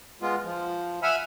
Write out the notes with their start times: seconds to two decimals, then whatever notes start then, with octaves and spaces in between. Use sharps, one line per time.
0.22 G#3 B3 F4
0.44 F3
1.03 E5 F#5 G#5 B5 E6 F6